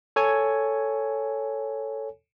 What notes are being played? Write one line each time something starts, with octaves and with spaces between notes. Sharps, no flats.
A4 C#5 G#5